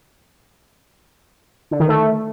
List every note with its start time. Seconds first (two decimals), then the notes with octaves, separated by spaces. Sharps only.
1.71 D3
1.80 D#3
1.88 A3